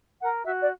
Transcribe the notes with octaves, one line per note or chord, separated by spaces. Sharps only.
A#4 F#5
F#4 E5
D5